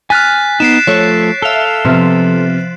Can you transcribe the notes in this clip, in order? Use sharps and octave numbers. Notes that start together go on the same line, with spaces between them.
G#5 F6 F#6 A6 B6
B3 D#4 C7 D7 E7
F3 A3 A4 C#5
A4 E5 F5 F7 G7
C3 F3 B3